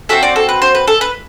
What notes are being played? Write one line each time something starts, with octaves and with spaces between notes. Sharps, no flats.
C4 F#4 A4 E5
D5
A4
B4
C5
B4
A4
B4